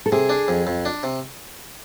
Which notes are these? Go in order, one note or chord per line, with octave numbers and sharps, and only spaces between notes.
A4
C3 G#4
D4
F2
F2
D4
C3